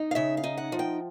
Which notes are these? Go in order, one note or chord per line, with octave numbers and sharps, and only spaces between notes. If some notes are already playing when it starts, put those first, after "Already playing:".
Already playing: D#4
F5
C#3 E5
F5
D#4
F#5
F3
G5